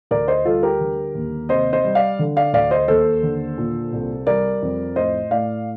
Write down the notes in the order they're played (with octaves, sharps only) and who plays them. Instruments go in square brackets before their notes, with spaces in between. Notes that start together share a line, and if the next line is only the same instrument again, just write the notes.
[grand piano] D2 A#4 D5
C5 D#5
G3 F4 A4
G4 A#4
D3
D#2
C3 C5 D#5
C5 D#5
G3
D5 F5
D3
D5 F5
D2 D5 F5
C5 D#5
D#2 A4 C5
D3
A#2
C2
G3 A#4 D5
F2
A2 C5 D#5
A2 D5 F5